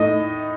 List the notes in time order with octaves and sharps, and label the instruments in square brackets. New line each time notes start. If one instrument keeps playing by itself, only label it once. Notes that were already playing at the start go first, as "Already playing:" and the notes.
Already playing: [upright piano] A2 A3 D#4 [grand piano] D#5